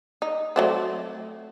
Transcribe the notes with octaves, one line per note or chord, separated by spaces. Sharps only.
D#4
F#3 A3 C4